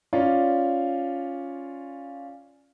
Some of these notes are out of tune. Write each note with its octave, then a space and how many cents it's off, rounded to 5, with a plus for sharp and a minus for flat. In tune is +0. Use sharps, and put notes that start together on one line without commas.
C#4 +0 F4 +0 D5 +0